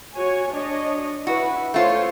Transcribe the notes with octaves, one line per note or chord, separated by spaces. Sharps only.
F#4 C#5 G#5
D4 C#5 D#5
E4 F#4 B4
A3 F4 A4 C5 C#5